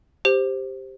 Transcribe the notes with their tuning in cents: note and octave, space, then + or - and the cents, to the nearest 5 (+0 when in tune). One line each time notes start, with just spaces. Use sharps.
G4 +0 C5 +0